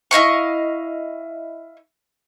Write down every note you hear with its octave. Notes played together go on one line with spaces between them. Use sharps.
E4 D#5 F5 C#6